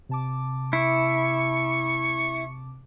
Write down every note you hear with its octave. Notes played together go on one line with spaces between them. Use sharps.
C3 A5 D6
E4 C#6